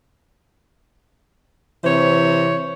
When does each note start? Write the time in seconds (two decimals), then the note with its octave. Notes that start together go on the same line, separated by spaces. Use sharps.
1.84 C3 E3 C5 C#5